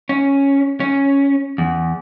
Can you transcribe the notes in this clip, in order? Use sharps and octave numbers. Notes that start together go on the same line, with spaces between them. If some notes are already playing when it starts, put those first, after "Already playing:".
C#4
C#4
E2